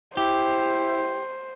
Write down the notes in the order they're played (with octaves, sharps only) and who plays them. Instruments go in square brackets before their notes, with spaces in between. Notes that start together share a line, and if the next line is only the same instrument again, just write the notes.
[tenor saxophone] E4 [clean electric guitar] G4 [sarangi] C5